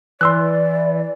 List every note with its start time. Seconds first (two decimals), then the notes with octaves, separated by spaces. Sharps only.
0.21 E3 D5 C6 E6 F#6